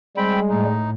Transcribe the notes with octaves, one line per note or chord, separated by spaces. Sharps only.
G3 G#3 C4 G5 B5
A2 D#4